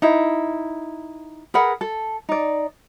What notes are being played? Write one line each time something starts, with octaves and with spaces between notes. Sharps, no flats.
D#4 E4
G#4 A#4 B4 F#5
A4
D#4 D5